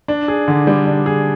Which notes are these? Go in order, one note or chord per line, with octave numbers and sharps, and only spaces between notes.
D4
G#4
D3
G3
D4
G#4